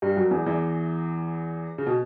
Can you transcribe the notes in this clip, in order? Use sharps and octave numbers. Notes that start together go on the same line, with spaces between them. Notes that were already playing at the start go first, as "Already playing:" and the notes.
G2 G3
F#2 F#3
E2 E3
E2 E3
C#3
B2